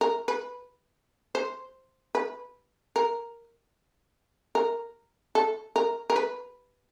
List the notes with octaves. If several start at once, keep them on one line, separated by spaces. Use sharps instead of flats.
A#4
B4
C5
B4
A#4
A#4
A4
A#4
A#4
B4